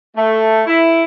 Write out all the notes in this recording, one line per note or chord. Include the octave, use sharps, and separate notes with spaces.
A3
E4